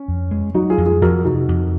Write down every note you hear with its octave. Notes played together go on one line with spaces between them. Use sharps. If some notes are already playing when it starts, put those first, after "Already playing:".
Already playing: C#4
F2
G#3
F#3 D#4 F#4
F4 G#4
F2
F4 G#4
F2 F#4 A#4
C3 D#4 F#4
F2